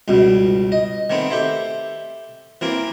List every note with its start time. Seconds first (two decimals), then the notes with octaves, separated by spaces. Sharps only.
0.08 C#2 G2 B2
0.72 D#5
1.10 D#3 A3 B3 C4
1.30 G4 A4 C5 E5
2.61 E3 A#3 C4 A#4